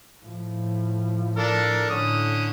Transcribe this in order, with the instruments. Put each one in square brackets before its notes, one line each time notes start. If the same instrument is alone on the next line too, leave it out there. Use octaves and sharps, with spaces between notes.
[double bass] A2 F3
[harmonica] D4 A4 A#4
[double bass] A2 [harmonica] D3 C#4 D#6